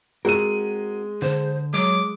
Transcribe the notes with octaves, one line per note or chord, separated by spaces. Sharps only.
G#3 C4 F#4 A#4 D#7
D3 C5
F#3 G#3 D6